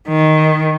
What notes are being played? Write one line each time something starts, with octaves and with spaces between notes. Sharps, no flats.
D#3